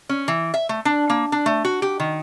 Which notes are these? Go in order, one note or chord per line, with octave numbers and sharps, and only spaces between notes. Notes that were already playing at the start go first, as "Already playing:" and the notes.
C#4
E3
E5
A3
D4
A#3
D4
A3
F#4
G4
D#3